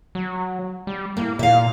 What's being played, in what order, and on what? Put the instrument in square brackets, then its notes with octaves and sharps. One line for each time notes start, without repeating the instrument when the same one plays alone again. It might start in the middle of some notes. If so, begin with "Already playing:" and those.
[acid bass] F#3
G3
[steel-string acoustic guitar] A2 [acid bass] A#3
[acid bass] A#2 [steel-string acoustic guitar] E5 F5